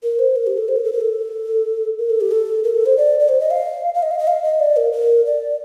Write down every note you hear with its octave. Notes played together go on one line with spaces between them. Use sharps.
A#4
C5
A#4
G4
A4
C5
A#4
A4
A#4
A4
A#4
A4
G4
A4
A#4
A4
C5
D5
D5
C5
D#5
F5
F5
D#5
F5
D#5
F5
D#5
D5
A#4
A#4
D5